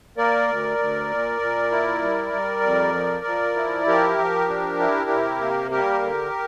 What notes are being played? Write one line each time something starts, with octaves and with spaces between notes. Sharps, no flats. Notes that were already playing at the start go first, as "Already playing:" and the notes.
A#3 A#4 D5
D2
D2
A#2
A#2
E4
G3
G3
F2
F3
F3
E4
F3 G4 A#4
F3
D4
E4
C3
A#3
G3 G4 A#4
D3